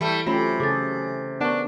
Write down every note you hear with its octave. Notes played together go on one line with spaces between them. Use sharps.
E3 G3 A3
C3 F#3 A3 C#4 F4 G4 B5
C#3 G#4 A4 D6 A6
B3 D4 A#4 F#5 C#6